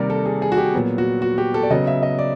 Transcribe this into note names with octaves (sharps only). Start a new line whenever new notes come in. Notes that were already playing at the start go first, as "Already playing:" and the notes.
Already playing: C3 D#3 G3 A#3 A#4 D5
A4
G#4
G#4
F#4
G4
A#2 F#3 B3
F#4
F#4
G4
A4
D5
C#3 F#3 B3 D#5
E5
D#5
D5